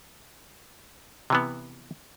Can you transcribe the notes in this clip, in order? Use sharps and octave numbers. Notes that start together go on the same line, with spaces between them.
C3 E3 B3